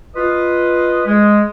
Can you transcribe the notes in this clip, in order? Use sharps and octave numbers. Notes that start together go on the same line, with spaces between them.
F4 B4 D#5
G#3